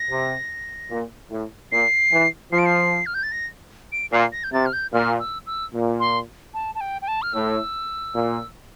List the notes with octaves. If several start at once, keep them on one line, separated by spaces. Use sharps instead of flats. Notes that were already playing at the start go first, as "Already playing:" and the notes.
Already playing: A#6
C3
A#2
A2
A#2 C7
E3
F3 C7
D7
C7
F6
G6
A6
A#6
D7
A#2 C7
A#6
G6
C3 A6
F6
G6
A#2 F6
E6
E6
A#2
C6
A5
A5
G5
G5
A5
F6
A2 E6
A#2